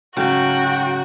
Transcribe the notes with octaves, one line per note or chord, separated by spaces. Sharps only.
G#2 C#3 F#3 A3 F#4 G5